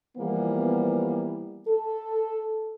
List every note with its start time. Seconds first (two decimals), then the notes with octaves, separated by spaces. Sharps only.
0.18 E3 F3 G3 A#3 B3
1.68 A4